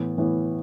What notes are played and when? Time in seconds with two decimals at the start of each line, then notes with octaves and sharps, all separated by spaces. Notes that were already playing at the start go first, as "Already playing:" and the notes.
Already playing: A2 E3 B3
0.18 A2 E3 B3